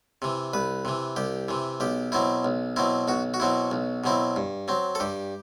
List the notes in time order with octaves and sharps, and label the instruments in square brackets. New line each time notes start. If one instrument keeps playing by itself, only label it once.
[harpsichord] C3 E3
C2 B4
C3 E3
C2 G4
C3 E3
B1 G4
B2 F#3 C4 E4
B1
B2 F#3 C4 E4
B1 F#4
F#4
B2 F#3 C4 E4
B1
B2 F#3 C4 E4
G2
F#3 C4
A4
G2 G4